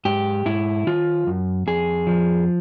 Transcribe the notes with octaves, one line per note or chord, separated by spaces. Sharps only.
G#2 G4
G#2 E4
D#3 F4
F#2
F2 G#4
F3